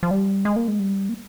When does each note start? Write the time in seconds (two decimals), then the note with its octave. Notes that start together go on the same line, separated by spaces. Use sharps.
0.03 F3
0.11 G3
0.45 G#3
0.56 A#3
0.68 G#3
0.79 G3
1.09 A#3